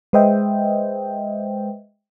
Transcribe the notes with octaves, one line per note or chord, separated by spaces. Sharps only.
G#3 B4 C5 D#5 E5 G5